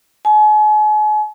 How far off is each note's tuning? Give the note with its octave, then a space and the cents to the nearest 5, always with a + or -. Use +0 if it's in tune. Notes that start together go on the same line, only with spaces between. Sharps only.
G#5 +40